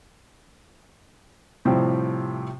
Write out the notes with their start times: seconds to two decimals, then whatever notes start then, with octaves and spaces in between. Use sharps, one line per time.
1.65 A2 C3 F3 G3 C4